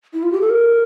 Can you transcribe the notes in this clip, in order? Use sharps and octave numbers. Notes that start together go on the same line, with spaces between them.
E4
F4
G4
A4
A#4